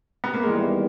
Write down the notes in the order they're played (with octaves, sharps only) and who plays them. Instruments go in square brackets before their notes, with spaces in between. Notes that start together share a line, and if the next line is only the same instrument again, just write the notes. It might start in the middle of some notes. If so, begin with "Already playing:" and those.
[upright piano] B3
A#3
[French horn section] E2 D#3 G3 B3 E4 [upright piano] G#3